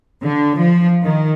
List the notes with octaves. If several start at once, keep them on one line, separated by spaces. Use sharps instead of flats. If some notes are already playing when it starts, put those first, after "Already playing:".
D3
F3
D#3